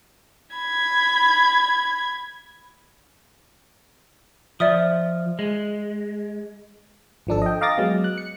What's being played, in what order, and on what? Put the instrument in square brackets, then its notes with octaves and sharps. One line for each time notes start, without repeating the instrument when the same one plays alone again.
[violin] B5 G#6
[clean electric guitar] F3 [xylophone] D5 E5 D#6
[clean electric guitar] G#3
[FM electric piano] G#1 F3 D4 A4
D#5 G5
D#5 F5 A#5 D6 A6 A#6
F#3 G#3 B3
F#6
C#7